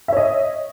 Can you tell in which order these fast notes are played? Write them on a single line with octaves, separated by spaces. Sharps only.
E5 C#5 D#5